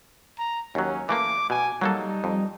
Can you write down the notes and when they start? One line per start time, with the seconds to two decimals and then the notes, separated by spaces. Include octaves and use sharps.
0.39 A#5
0.75 D#2 F#3 C#4
1.09 E3 A3 A#3 D6
1.50 B2 G#5
1.81 F#3 G3 A#3 D#4 A4
2.24 F2